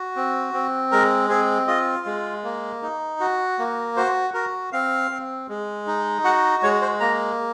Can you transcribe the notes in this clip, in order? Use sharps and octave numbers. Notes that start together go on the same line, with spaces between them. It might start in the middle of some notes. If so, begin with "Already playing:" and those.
Already playing: F#4
C4
C4
G#3 A#4
C4 G#4
F4 D#5
G#3
A#3
D#4
F#4
A#3
F#4 C5
F#4 A#4
C4 F5
C4
G#3
D#4
F#4 F#5
G#3 C#5
C5
A#3 A#5